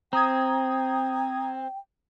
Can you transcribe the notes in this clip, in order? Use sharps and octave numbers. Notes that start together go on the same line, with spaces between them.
C4 G5 A#5 D#6 G#6